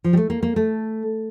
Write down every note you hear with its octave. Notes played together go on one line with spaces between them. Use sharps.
F3
G3
A3
A#3
A#3
A3